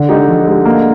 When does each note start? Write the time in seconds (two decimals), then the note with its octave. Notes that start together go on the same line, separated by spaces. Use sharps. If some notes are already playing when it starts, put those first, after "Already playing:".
Already playing: D3
0.09 G#3 D#4 G4
0.28 F3
0.47 G#3 D#4 G4
0.65 A#3